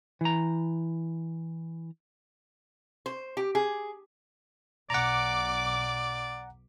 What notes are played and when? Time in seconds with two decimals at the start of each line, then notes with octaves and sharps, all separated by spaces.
0.21 E3 A#5
3.06 C5
3.37 G4
3.55 G#4
4.90 B1 D5 F#5 A#5 D6